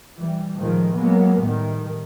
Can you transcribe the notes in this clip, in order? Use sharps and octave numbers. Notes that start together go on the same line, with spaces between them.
E3 G3
A2 D#3 F3 G#3
F#3 G#3 A#3 B3
A2 D#3 G3